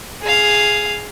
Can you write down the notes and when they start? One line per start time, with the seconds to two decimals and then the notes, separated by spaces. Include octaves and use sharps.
0.23 G#4 F5